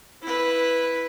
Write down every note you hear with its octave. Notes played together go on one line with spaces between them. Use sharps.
E4 B4